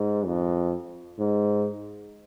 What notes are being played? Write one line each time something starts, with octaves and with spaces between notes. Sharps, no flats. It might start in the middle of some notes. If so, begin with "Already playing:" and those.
Already playing: G#2
F2
G#2